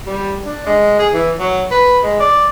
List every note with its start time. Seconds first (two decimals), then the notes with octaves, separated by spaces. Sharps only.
0.07 G3
0.46 D4
0.67 G#3
0.99 G#4
1.13 E3
1.39 F#3
1.71 B4
2.04 G#3
2.20 D5